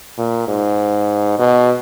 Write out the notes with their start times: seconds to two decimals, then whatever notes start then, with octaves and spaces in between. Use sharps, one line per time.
0.18 A#2
0.47 G#2
1.39 B2